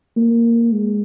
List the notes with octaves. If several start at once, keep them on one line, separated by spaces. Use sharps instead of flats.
A#3
G#3